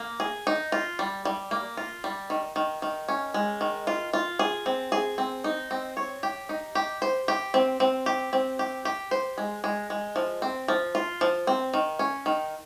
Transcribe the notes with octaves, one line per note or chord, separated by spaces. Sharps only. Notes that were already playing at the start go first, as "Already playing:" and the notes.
Already playing: A#3
G#4
D#4
F4
G3
G3
A#3
F4
G3
D#3
D#3
D#3
C#4
G#3
D#3
F4
F4
G#4
C4
G#4
C4
D#4
C4
C#5
G4
D#4
G4
C5
G4
C4
C4
G4
C4
G4
G4
C5
G#3
G#3
G#3
F3
C4
F3
F4
F3
C4
D#3
C#4
D#3